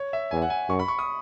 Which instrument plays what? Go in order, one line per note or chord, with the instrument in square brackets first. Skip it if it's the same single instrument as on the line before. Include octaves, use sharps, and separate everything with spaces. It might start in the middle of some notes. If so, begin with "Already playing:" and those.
Already playing: [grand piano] C#5
E5
[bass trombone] E2 [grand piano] G#5
[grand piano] F#5
G#5
[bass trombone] F#2 [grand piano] C#6
[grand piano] B5
C#6
D#6